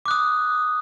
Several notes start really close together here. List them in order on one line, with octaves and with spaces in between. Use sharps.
D6 F#6 D#6